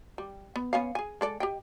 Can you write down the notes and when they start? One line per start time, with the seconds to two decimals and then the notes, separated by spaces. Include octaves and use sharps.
0.18 G3
0.56 B3
0.73 B3 C#4 F5
0.95 G#4 G#5
1.21 G#3 A4 D5
1.40 G4 D#5 G5